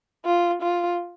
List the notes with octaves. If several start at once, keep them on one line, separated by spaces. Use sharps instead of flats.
F4
F4